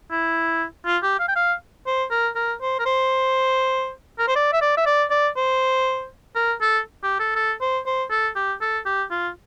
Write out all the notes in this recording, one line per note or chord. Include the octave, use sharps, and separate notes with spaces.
E4
F4
G4
F5
G5
F5
C5
A#4
A#4
C5
A#4
C5
A#4
C5
D5
E5
D5
E5
D5
D5
C5
A#4
A4
G4
A4
A4
C5
C5
A4
G4
A4
G4
F4